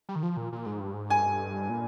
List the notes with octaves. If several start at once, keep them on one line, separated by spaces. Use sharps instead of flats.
G3
D#3
F3
A#2
A#2
G#2
G2
G#2
G2 G#5
A#2